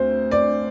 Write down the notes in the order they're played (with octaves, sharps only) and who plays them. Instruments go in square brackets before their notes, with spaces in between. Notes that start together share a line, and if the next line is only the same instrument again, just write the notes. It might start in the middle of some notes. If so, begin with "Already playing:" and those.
Already playing: [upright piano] D2 C4 C5
D5